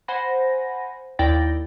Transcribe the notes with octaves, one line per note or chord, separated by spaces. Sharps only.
C5 F#5 G#5 B5 A#6
D#2 E4 D5 G5 A6 A#6